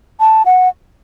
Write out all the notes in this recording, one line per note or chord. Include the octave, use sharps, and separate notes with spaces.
A5
F#5